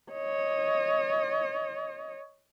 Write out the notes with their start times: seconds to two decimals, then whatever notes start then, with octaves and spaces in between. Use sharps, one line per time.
0.12 C#5 D#5